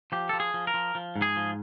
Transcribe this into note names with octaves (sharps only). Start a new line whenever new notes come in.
F3 G4
F3 A4
G#4
F3
A#4
F3
F3
G#2
G#4
F3